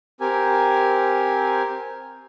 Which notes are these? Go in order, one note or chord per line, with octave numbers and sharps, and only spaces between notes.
C4 G4 A#4 G#5